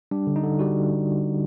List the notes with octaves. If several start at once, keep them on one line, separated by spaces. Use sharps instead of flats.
G3 D4
D3
D#4
D3
G3 F#4